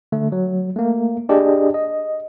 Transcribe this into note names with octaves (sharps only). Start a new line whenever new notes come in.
D3 A3
F#3
A3 A#3
D4 G4 G#4 D5 D#5
D#5